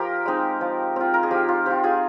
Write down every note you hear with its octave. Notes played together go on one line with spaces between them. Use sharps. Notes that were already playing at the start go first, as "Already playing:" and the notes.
Already playing: F3 G4 A#4
G#3 C4 D#4
F3
C4 F4
A#4
G#4
F3 G4
F4
C4 F4 G4
F4 G#4